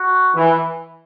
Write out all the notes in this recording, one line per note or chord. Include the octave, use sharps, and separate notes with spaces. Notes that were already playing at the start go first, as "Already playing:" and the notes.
Already playing: F#4
E3